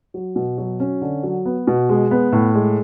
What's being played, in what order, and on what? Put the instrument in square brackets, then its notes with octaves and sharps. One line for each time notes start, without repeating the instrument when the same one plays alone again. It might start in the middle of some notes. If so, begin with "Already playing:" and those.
[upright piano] F#3
B2
F#3
C#4
D3
F#3
B3
B2
G#3
B3
A2
G#3